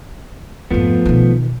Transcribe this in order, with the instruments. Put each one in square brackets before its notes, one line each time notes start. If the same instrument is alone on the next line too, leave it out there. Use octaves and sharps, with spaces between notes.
[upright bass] F2 G#2 [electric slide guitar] F3 A3 B3
[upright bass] B2 D#3